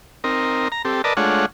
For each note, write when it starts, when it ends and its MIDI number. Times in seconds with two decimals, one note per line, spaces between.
0.24 0.68 60
0.24 0.68 63
0.24 0.68 70
0.72 0.82 82
0.85 1.02 60
0.85 1.02 67
0.85 1.02 69
1.04 1.13 70
1.04 1.13 71
1.04 1.13 74
1.04 1.13 75
1.04 1.13 81
1.17 1.46 56
1.17 1.46 57
1.17 1.46 62
1.17 1.46 65
1.17 1.46 73
1.17 1.46 78